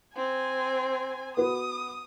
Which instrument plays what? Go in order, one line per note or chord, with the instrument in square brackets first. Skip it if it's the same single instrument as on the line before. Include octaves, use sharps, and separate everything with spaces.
[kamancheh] C4 G#5
[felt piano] B3 F#4 B4 [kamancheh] D#6